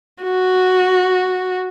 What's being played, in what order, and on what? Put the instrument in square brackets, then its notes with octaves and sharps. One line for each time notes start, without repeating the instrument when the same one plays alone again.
[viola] F#4